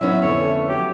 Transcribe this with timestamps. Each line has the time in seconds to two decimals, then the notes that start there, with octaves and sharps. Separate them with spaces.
0.01 F#3 B3 C#4 D#4 E4 F#4 E5
0.22 F2 D3 E3 C#5
0.41 A3
0.69 F#3 G4